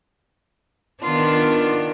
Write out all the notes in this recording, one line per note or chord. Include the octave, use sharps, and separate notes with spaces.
D#3 B3 D4 F4